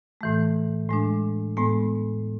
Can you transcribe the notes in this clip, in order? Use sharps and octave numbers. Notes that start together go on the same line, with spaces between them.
A2 E3 A3
A2 G#3 D4
A2 G#3 B3